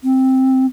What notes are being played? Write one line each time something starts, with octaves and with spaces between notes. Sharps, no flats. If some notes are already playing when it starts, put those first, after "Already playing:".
C4